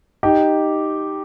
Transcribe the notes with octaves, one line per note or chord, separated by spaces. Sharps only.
D#4 G4